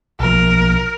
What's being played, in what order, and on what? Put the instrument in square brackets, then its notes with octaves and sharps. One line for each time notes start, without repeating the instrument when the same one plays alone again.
[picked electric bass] B1 F3 [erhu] A#4